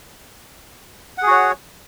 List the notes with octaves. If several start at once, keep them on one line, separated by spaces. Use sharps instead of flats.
F#4 G#4 C#5 F#5